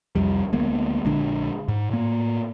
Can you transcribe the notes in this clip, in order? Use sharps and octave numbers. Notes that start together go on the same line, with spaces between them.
C2 F2 G3
D2 G#3 A#3 B3
A#1 D3 G#3 D4
G#2
A2 A#3